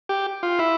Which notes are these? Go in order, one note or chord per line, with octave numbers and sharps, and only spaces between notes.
G4
F4
E4